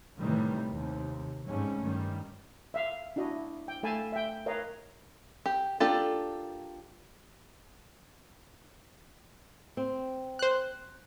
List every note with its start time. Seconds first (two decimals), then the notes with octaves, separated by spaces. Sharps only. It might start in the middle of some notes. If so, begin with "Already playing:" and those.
0.18 A2 C3 D#3 E3 G3
0.70 D#2 C3
1.46 G#2 C3 G3 A3 C#4
1.82 G2 D#3 G3
2.74 E5 F5
3.16 D4 E4 F#4 D#5
3.68 G5
3.83 A3 A4 F5 G#5 A5 B5
4.12 E5 G5
4.46 A#4 B4 C#5 D#5 F5 A#5
5.46 G4
5.80 A#3 D4 F4 G4 A4
9.77 C4
10.39 C5 F#6